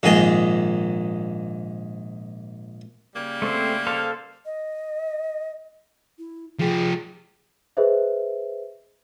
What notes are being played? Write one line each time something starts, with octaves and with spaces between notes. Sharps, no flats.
A#1 G#2 D#3 G#4 D#5
C#3 G3 A#3
A3 C4 C5
A4 C5 F5
D#5
E4
F3 G4 G#4
G#4 B4 C5 D#5 E5